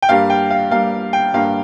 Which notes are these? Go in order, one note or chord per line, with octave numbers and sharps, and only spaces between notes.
G5
G2 G3 A#3 F5
G5
F5
G2 G3 A#3 F5
G5
G2 G3 A#3 F5